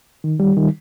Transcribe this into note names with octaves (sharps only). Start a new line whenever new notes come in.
D#3
G3
D#3